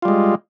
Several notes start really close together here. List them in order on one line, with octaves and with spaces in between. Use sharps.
F4 G3 G#3